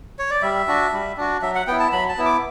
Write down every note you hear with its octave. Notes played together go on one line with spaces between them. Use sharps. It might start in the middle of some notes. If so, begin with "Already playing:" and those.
C#5
D5
G3 E5
D4 F#4
G3
D4 F#4
F#3 E5
F#5
B3 E4 G5
A5
F#3 B5
A5
B3 E4
D6